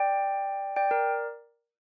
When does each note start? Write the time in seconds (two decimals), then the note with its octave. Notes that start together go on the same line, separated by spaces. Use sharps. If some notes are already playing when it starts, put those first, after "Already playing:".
Already playing: D5 G5
0.76 D5 G5
0.91 A#4 D5